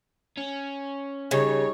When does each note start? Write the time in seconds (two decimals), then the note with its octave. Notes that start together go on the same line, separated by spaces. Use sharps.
0.38 C#4
1.31 C#3 G3 D#4 C#5